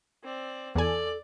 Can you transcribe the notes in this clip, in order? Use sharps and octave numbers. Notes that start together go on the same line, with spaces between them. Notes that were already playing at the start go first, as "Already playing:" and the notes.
C4 D5
E2 A4 D5 G#5